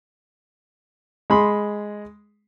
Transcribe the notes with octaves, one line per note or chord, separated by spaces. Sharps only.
G#3 B5 C6